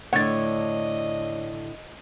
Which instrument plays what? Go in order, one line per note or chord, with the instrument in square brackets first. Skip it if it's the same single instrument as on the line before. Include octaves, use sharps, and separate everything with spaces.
[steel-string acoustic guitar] A2 D3 D4 [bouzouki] C#5 [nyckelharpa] D#5 [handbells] F#5 A6